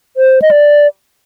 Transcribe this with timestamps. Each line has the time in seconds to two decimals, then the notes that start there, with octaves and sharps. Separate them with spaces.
0.17 C5
0.42 D#5
0.51 D5